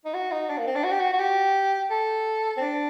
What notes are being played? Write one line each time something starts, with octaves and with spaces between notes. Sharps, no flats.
D#4
F#4
D#4
D4
A#3
C4
D4
F#4
G4
F#4
F#4
G4
A4
C4
D4